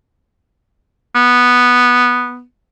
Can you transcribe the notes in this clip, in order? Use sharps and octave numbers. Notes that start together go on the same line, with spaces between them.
B3